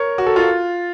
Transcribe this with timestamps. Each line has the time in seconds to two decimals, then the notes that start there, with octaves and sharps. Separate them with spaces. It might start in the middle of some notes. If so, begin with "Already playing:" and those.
Already playing: A#4 C#5
0.18 F#4
0.26 A4
0.36 F4